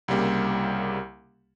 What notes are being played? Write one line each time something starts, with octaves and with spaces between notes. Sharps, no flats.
C2 C#3 G3 A#3